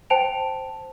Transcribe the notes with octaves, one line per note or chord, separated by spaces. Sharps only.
C5 G5 A5 D7 F7